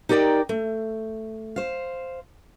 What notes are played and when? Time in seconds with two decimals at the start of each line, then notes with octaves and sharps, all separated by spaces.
0.09 D#4 G4 A#4 D5 G5
0.49 A3
1.56 C5 F5